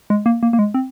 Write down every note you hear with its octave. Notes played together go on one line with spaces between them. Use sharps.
G#3
A#3
A#3
A#3
G#3
C4